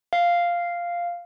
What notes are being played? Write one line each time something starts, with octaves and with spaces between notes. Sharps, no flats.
F5